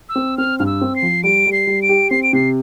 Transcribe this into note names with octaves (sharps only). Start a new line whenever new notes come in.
E6
C4
C4 F6
G2 F6
E6
C4
C7
F3
G3 D7
G3
C7
G3
D7
G4
C4 C7
D7
C3 C7